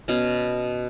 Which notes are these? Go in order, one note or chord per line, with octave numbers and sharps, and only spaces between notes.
B2 C#4